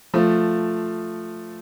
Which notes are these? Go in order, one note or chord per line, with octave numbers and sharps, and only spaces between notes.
F3 A3